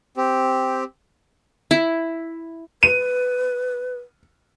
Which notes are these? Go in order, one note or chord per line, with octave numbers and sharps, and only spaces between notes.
C4 G4
E4
B4 D#7